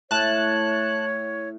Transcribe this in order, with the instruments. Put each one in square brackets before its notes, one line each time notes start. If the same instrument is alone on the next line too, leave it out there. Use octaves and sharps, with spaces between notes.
[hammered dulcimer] A2 [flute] C#5 [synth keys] A5 F#6